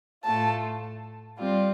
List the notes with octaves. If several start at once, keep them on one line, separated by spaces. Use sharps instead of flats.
A2 A3 F4 A5
G3 C4 F4 D5